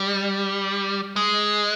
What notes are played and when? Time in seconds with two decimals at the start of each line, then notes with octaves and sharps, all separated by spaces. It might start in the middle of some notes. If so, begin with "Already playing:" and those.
Already playing: G3
1.16 G#3